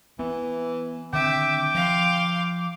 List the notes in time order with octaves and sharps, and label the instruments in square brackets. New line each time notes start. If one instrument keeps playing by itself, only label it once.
[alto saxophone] E3 [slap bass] B3
[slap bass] D3 D#3 C4 [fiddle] E5 [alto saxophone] G5 [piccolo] D6
[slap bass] F3 [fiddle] F5 C6